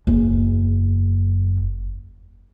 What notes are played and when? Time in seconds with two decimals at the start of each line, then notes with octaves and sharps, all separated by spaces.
0.07 F#1 E2